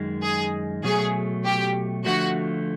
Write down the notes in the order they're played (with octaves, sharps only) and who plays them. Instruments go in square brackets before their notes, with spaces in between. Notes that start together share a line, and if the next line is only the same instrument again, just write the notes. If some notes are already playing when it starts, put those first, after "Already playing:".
Already playing: [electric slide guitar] F#2 D#3 G#3
[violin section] G#4
[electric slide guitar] B2 F#3 A3 [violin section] G#4
[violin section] G4
[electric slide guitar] D3 F3 A3 [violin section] F#4